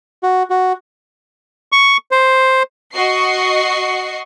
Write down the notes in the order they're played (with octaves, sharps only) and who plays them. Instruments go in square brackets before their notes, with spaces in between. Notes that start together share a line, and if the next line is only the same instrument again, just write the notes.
[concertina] F#4
F#4
C#6
C5
[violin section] F#4 D#5 C#6 C7